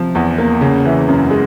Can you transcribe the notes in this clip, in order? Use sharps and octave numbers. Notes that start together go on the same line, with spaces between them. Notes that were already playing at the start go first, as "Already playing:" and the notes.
Already playing: C3 F3
E2
A#3
C#3
E3
F#2
G#3